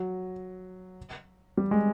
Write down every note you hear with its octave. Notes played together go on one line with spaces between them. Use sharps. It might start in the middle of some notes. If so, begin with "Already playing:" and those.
Already playing: F#3
G3
G#3